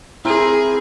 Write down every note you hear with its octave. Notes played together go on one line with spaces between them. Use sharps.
C4 E4 G#4 A#4